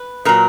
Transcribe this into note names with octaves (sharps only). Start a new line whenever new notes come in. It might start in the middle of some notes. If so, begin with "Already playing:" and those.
Already playing: B4
A#2 F#3 A#4